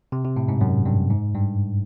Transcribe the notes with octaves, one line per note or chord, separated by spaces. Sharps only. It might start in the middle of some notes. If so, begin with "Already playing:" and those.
C3
C3
A2
G#2
F#2
G2
G#2
G2